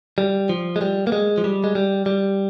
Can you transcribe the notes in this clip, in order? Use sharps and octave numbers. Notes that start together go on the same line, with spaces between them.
G3
F3
G#3
G3
A#3
G#3
F3
G3
G#3
G3
G3